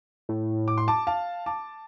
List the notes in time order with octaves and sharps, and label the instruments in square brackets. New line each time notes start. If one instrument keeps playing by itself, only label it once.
[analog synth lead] A2
[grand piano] D6
C6
A5 D6
F5 A5
A5 D6